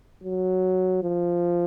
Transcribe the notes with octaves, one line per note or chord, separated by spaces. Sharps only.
F#3
F3